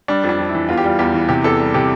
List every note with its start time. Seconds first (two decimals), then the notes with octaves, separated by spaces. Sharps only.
0.08 G3 D4
0.24 F2
0.29 D4
0.39 F2
0.49 E4
0.54 E3
0.69 E2 F4
0.77 G4
0.84 G3 F4
0.99 E2 G4
1.14 E3
1.29 C3 G4
1.44 E2 A4
1.59 G3
1.74 C3 G4